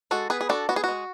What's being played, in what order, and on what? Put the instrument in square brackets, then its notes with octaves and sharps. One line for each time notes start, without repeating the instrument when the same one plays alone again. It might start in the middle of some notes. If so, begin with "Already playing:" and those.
[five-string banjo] G#3 F#4 A4
B3 G#4 B4
G#4
D4 F#4 A4
B3 F#4
G#4
G#3 F#4